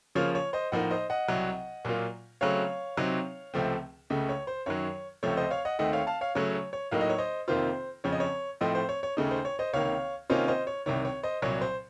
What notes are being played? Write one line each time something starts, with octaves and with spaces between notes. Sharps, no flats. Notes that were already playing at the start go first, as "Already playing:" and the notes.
C#3 F3 A#3 F4 C#5
C#5
C5 D#5
A2 F3 A#3 D#4 D#5 F#5
C5 D#5
D#5 F#5
C2 C3 F#3
A#2 F#3 A#3 F4
C#3 F#3 A3 C4 C#5 F5
C3 F#3 C4 D#4
C#2 C3 F3 A3 C4
C#2 C#3 A3
C#5
C5
F#2 D#3 F#3 C#5
C#2 C3 F3 A3 C#5
C5 D#5
C#5 F5
D#5 F#5
D#2 D#3 A3 C4 D#5 F#5
C#5 F5
F5 A5
C#5 F5
C#3 F#3 A3 C#5
C#5
C#5
A2 F#3 A#3 D#4 F5
D#5
C#5
C5 D#5
F2 C3 D#3 A#3 F4 C5
F2 C#3 F3 C#5
D#5
C#5
A2 F3 A3 C4 C5 D#5
C5
C#5
C#5
D#2 C#3 A3 D#4
C5
C#5
C5 D#5
C#2 C3 D#3 A#3 C#5 F5
C3 D#3 A#3 C#4 F4 C5 D#5
C5 D#5
C#5
C2 C3 D#3 C#5
C#5
C5 D#5
C2 A#2 F#3 C#5
C5